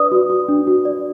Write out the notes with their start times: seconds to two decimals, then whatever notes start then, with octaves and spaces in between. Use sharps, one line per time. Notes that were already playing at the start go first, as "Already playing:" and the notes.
Already playing: D4 B4 D5 D#6
0.12 F#4
0.30 F#4
0.49 D4
0.67 F#4
0.85 D5